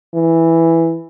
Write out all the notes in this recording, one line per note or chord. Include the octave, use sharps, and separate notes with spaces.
E3